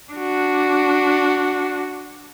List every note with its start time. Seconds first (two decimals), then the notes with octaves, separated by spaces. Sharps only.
0.14 D4 F#4